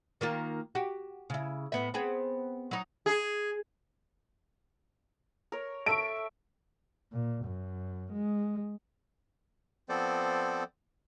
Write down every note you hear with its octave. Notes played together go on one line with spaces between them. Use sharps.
D#3 A#3 F4
F#4 G4
C#3 E4
A2 B3 E5
B3 C4 G#4
F#3 D#4
G#4
A#4 C#5
A4 E5 C#6 D7
A#2
F#2
G#3
F3 B3 C4 A4 C5 D5